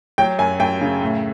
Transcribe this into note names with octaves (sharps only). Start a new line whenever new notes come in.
F#3 G5
F#2 G#5
F#2 G5
C#3
A2